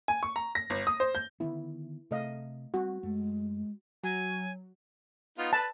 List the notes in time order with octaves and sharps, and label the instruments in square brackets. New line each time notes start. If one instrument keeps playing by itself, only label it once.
[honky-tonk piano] G#5
C#6
A#5
A#6
G1
D#6
C5
G6
[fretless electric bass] D3 D#3 B3 [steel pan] E4
[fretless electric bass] C3 [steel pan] A3 D#5 F5
[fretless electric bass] G3 C4 [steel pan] F#4
[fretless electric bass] F#2 A3 [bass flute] G#3
[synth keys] F#3 [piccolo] G#5
[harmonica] B3 D#4 F4
[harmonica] B4 [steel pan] A5